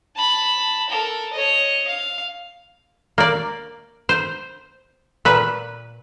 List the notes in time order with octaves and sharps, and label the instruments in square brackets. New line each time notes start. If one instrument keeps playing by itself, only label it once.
[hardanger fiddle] A5 B5
A4 A#4
C#5 D#5
F5
[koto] A#3 D5
C5
A#2 B4